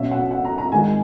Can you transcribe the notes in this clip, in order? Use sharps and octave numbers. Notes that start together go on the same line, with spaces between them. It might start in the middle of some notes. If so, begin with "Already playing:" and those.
Already playing: B2 F#3 C#4 E5
F#5
F#5
A#5
A#5
G#2 D#3 G#3 G#5